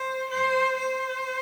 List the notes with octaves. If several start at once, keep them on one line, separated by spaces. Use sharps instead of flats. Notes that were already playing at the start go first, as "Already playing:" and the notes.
Already playing: C5
C5
C5